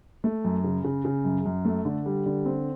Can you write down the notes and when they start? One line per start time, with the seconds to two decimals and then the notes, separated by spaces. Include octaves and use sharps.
0.24 A3
0.45 F#2
0.64 C#3
0.84 C#3
1.05 C#3
1.25 F#2
1.46 F#2
1.65 A3
1.85 D3
2.06 G3
2.26 D3
2.46 C4